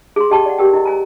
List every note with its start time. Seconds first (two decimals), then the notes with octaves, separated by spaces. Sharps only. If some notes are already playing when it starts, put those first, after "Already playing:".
0.16 G#4 C6
0.30 G4 D#5 G5 A5 C#6
0.46 D5 F#5
0.59 G4 A#4 G5
0.73 E4 D#5
0.85 C5 G#5 A#5